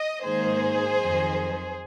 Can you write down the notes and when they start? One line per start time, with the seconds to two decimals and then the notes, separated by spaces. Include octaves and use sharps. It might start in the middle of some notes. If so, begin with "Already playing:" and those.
Already playing: D#5
0.24 G#2 D#3 A#3 D#4 G#4 C5
0.96 F2 D#3 F#3